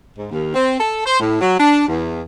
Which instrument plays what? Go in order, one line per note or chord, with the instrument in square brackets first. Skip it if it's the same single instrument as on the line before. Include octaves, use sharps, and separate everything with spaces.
[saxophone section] G#2
D#2
C4
A4
C5
A2
F#3
D4
E2